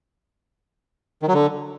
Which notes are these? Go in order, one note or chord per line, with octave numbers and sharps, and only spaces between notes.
D#3
F#3
D3